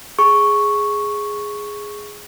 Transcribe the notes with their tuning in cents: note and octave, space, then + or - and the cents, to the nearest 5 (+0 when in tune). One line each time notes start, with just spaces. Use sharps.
G#4 +0 C#6 +0